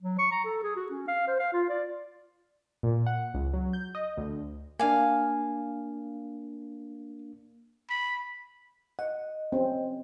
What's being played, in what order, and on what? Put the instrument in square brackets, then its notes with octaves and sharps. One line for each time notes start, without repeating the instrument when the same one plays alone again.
[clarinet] F#3
C#6
A#5
A4
G#4
F#4
C#4
F5
C5
F5
F4
D5
[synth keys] A#2
F#5
C#2
F#3
G6
D#5
D2
[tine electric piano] A#3 D4 [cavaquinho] F5 G#5
[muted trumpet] B5
[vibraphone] D#5 [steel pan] F#5
[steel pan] C4 C#4